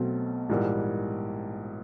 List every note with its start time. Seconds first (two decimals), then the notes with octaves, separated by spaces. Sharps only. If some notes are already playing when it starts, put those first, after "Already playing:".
Already playing: B1 B2 F#3 A3 C4
0.49 A#1 G#2 E3 G3 A#3